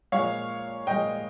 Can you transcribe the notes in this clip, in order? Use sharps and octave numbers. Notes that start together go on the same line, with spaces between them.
A#2 F3 G#3 C#5 F5
A#2 F3 G#3 D#5 G5